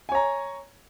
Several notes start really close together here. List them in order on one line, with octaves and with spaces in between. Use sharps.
G#5 C#5 A#5